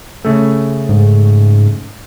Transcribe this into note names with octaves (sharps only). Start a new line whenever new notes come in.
C#3 A3
G#2